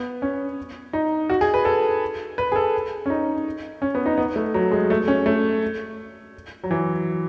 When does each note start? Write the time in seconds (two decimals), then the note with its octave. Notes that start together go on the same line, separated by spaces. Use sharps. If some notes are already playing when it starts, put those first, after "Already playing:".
Already playing: B3
0.22 C#4
0.93 D#4
1.30 F#4
1.41 G#4
1.54 B4
1.65 A4
2.38 B4
2.52 G#4
2.56 A4
3.06 C#4
3.10 D#4
3.82 C#4
3.95 B3
4.06 D#4
4.18 B3
4.36 A3
4.54 F#3
4.72 G#3
4.90 A3
5.08 C#4
5.26 A3
6.64 F#3
6.71 E3